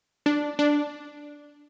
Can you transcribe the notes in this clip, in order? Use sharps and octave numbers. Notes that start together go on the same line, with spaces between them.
D4
D4